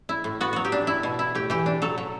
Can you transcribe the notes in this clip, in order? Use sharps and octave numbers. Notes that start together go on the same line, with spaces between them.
E4
A2
B3 F#4
F#3 F#4
G4
D4
E4
B2
E4
A2 G4
E3 G4
D4
F#3 A4
F#3